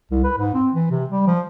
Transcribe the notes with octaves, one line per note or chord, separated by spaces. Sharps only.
C2
B4
G#2
C4
E3
C3
G3
F3